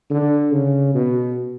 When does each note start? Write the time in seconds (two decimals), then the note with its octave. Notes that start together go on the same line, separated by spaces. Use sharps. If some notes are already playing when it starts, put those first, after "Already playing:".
0.11 D3
0.52 C#3
0.94 B2